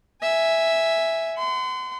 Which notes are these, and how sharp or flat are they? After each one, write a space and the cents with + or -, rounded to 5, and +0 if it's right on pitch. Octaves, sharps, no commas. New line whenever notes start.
E5 +0 G#5 +0
F#5 +15 C6 -35